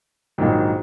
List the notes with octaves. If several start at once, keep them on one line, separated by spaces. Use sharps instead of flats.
A#1 G#2 D#3 F#3